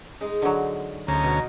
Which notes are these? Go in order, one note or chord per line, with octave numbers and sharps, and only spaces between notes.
G#3 D#4
D3 F#3
D2 C#4 C5 D#5 A#5
B2